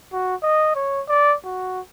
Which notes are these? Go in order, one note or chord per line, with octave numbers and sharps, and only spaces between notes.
F#4
D#5
C#5
D5
F#4